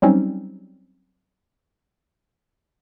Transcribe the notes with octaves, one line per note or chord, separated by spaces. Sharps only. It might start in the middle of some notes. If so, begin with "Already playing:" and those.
F#3 G3 C4 C#4 D#4